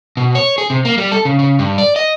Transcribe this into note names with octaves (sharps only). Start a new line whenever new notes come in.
B2
C#5
G#4
C3
A#3
G3
A4
C#3
C#3
G2
D5
D#5